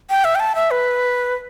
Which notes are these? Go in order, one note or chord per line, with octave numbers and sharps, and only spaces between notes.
G5
E5
G5
A5
E5
B4